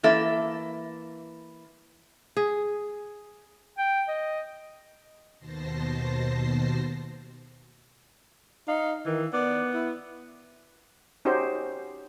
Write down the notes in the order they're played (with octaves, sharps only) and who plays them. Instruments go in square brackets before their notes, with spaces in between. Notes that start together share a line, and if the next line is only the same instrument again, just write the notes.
[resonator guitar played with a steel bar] E3 A#3 A4 E5
[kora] G#4
[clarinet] G5
D#5
[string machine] D#2 B2 C5 A5 A#6 C7
[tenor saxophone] D#4 [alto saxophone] F5
[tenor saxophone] D#3 [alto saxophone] E3
[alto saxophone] B3 [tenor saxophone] D5
[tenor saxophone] E4
[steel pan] C#4 D#4 F#4 G4 C5